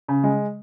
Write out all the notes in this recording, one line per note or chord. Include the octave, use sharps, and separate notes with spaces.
C#3
G#3